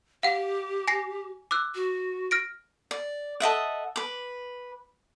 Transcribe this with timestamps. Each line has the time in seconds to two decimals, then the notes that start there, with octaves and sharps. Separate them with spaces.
0.23 G4 F5 F#5
0.88 G#5 A#6 C7
1.51 D6 E6 F#6
1.75 F#4
2.31 F6 A#6 D7
2.91 D5
3.40 A4 D#5 E5 F#5
3.96 B4 D6